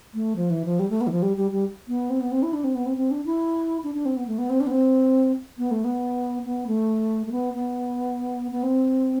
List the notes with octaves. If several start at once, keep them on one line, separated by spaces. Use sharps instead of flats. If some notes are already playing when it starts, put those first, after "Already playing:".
A3
F3
E3
F3
G3
A3
B3
E3
F3
G3
G3
G3
B3
C4
B3
C4
E4
D4
C4
B3
C4
C4
D4
E4
D4
D4
C4
B3
A3
B3
C4
D4
B3
C4
B3
A3
B3
B3
A3
A3
B3
B3
B3
C4